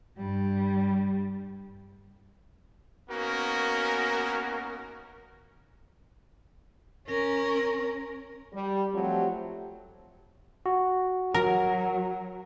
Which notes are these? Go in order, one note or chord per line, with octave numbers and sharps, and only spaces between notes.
G2 G3
A#3 B3 C#4 D#4 F#4 A#4
C#4 A#4
G3
F3 F#3 A3 C4 G4
F#4
F#3 A#4